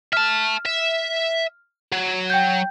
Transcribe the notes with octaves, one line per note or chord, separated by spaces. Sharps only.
E5 A5 F6
E5
F#3
G5 G6